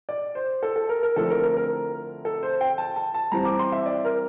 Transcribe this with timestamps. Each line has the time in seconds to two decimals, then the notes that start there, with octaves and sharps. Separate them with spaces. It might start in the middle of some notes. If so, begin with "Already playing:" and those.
0.09 D5
0.35 C5
0.63 A4
0.76 A4
0.89 A#4
1.03 A#4
1.16 F2 D3 A3 C4 E4 A4
1.30 A#4
1.43 A#4
1.57 A#4
2.25 A4
2.43 C5
2.61 G5
2.78 A5
2.96 A5
3.14 A5
3.32 G2 E3 G3 C4 E4 A#5
3.45 D6
3.59 C6
3.72 E5
3.86 D5
4.05 A#4